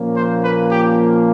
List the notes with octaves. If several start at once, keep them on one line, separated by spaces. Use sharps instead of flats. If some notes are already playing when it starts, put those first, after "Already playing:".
Already playing: A#2 F3 A#3 C#4
C5
B4
G4